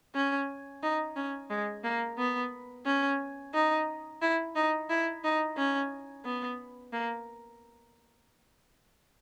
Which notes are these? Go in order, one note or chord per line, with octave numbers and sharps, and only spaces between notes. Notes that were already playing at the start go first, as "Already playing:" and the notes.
C#4
D#4
C#4
G#3
A#3
B3
C#4
D#4
E4
D#4
E4
D#4
C#4
B3
A#3